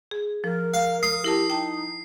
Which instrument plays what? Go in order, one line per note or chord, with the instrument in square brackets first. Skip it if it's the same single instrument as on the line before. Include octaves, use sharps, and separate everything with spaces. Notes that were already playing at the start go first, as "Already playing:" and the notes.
[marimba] G#4
[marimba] F3 [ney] A#4
[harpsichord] F5
[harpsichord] D#6 [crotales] C7
[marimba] E4 A#4 A5 [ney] G4
[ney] D#4 [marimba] G5 A5